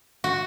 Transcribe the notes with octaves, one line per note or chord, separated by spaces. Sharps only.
F#4